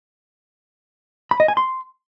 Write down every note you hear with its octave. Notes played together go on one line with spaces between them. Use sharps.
B5
D#5
G#5
C6